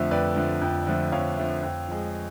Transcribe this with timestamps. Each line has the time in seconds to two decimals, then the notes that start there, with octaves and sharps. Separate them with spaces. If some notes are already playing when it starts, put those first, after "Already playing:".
Already playing: F2 D3 F3 A3
0.11 F2 B4 D5
0.36 D3 F3 A3
0.61 F2
0.87 D3 F3 A3
1.12 F2 C#5 F5
1.37 D3 F3 A3
1.63 F2
1.88 F3 G#3